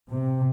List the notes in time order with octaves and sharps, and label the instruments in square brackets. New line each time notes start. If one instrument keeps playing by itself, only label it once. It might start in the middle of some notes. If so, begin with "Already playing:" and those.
[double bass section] C3